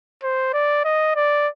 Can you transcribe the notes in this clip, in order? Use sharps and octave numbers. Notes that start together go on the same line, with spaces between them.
C5
D5
D#5
D5